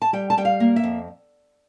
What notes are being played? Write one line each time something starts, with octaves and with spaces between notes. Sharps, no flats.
A5
G3 G5
A5
G3 G5
F5
A#3
E5
F2